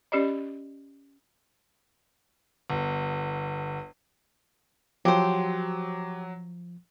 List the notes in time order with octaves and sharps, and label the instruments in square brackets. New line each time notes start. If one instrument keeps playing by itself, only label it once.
[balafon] C#4 G4 D5 D#5
[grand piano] G1
[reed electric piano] F3 [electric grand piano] F#3 [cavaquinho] G4 C5